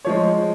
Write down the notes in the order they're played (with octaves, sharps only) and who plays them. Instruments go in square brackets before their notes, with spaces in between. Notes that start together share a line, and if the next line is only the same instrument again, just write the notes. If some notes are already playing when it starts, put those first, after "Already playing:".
[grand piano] F3 G#3 C#5